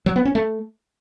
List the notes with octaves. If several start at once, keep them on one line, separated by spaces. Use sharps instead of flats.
F#3
B3
C#4
A3